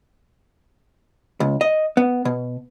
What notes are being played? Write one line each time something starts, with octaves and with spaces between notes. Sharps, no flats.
C#2
D#5
B3
B2